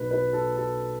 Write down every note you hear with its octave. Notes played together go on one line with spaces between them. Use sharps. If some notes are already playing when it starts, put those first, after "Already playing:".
Already playing: B1 B2 B4
B4
A4
A4